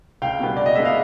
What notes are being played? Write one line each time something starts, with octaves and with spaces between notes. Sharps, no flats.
C#2 F5 G5
B2 G3 B3
B2 D5
D#5
G#3 B3 E5
F5